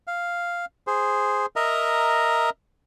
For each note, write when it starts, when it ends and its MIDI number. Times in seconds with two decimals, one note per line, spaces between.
0.07 0.65 77
0.87 1.46 68
0.87 1.46 72
1.56 2.50 70
1.56 2.50 75
1.56 2.50 76
1.56 2.50 82